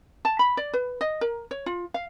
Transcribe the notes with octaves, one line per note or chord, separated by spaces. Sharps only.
A5
B5
D5
B4
D#5
A#4
C#5
F4
F5